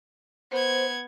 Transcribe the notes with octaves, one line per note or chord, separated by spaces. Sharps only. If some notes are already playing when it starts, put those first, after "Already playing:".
B3 C5 G#6